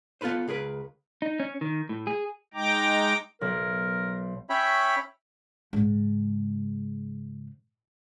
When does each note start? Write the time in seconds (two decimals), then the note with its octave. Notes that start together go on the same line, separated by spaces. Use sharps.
0.21 B3 F4 A4 B4 C5
0.48 C#2 G#4 A#4 B4
1.22 D#4
1.40 C#4
1.61 D#3
1.89 A2
2.07 G#4
2.54 G#3 D#4 G5 A#5 D6
3.41 B1 A#4
4.50 C#4 C#5 E5 G5 B5
5.73 G#2 C#3